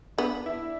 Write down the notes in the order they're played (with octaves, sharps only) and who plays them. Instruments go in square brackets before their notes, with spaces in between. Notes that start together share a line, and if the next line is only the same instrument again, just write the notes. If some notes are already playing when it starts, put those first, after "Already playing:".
[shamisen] B3 [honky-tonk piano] D4
[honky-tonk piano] E4